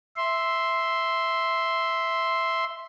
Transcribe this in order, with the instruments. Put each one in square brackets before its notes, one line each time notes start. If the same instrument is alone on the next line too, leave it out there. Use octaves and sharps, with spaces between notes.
[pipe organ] E5 C6